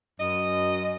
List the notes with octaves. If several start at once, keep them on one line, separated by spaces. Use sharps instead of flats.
F#2 D#5